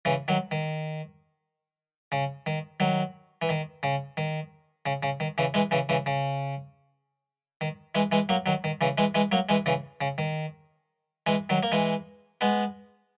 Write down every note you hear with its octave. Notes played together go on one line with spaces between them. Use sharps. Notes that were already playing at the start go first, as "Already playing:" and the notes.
C#3 E3
D#3 F#3
D#3
C#3
D#3
D#3 F#3
E3
D#3
C#3
D#3
C#3
C#3
D#3
C#3 E3
E3 G#3
C#3 E3
C#3 E3
C#3
D#3
E3 G#3
E3 G#3
F#3 A#3
D#3 F#3
D#3
C#3 E3
E3 G#3
E3 G#3
F#3 A#3
E3 G#3
C#3 E3
C#3
D#3
E3 G#3
D#3 F#3
A#3
E3 G#3
G#3 B3